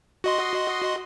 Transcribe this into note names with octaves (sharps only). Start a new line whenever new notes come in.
F#4 D#5 C6